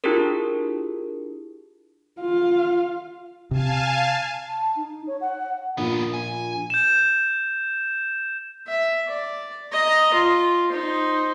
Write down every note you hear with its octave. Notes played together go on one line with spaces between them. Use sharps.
D4 E4 F4 G4 G#4 A#4
F4 F5
C3 F5 G#5 A5
A5
D#4
C#5
F#5
A#1 D#2 A#2 B3
G#5
G6 E7
E5
D5
D#5 A#5
F4
D#4 C5